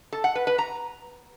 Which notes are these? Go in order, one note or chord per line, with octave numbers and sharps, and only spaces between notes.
A4
F#5
B4
B4
A#5